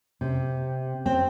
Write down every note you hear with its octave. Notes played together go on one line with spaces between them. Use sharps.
C3
C4